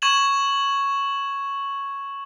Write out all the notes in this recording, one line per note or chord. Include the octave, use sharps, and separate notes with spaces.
C#6 G#6 E7 F#7